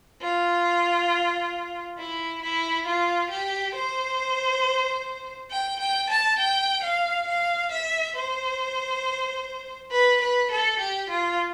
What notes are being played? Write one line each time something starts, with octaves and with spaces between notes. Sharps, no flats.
F4
E4
E4
F4
G4
C5
G5
G5
A5
G5
F5
F5
E5
C5
B4
B4
A4
G4
F4